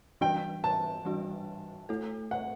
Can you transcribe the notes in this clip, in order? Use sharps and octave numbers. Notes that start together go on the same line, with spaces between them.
E3 G3 D4 F#4 G5
A5
E3 G3 D4 F#4
A3 E4 A4
F#5